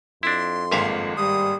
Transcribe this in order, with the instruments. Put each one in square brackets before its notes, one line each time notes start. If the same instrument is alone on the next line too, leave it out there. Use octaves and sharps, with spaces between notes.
[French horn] F2 [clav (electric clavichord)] D4 E4 [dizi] C6
[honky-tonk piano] G#1 G#3 A#3 [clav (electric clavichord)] G2 E5 F5
[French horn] G3 [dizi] D#6